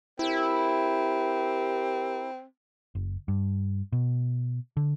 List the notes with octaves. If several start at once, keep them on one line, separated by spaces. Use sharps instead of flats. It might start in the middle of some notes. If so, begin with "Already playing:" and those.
C4 E4 G4 A#4
F#1
G2
B2
D3